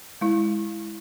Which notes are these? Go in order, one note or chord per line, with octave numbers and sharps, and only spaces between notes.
G#3 E4